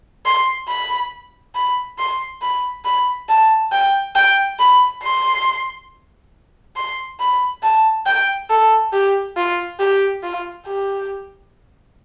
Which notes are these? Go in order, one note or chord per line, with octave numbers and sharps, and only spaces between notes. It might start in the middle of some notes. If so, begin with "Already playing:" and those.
C6
B5
B5
C6
B5
B5
A5
G5
G5
B5
C6
C6
B5
A5
G5
A4
G4
F4
G4
F4
G4